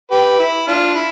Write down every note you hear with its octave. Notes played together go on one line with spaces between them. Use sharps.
G4 B4
E4
D4 F4
E4